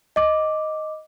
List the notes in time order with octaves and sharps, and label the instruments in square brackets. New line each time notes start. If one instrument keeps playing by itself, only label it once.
[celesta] D#5 D6